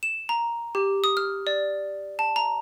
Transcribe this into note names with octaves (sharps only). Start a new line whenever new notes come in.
E7
A#5
G4
D#6
F6
D5
A5
A#5